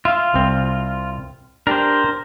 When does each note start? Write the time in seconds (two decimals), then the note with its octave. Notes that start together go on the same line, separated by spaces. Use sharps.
0.05 F4 E5 F5
0.34 C2 C4
1.67 D4 G4 A#4 C5